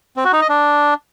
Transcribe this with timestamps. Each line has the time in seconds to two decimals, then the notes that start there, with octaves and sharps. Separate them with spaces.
0.17 C4
0.25 F#4
0.33 D#4
0.41 D#5
0.49 D4